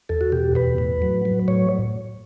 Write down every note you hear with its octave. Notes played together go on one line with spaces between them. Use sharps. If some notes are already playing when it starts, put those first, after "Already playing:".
E2 A4
F#4
B2 G4
E2 B4
A2
F#3
F#3
A2 C#5